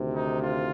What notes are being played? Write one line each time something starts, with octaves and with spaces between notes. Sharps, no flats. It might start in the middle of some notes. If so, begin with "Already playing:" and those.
Already playing: D2 C3 D#3
D#4
F4